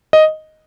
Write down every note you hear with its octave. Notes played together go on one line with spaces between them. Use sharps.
D#5